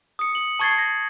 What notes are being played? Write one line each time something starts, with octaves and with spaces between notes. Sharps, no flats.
D#6 C#7
F#7
A5 C#6 G#6 A6 C7
A#6